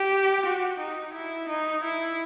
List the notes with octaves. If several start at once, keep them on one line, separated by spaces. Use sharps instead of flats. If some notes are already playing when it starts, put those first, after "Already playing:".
Already playing: G4
F#4
D#4
E4
D#4
E4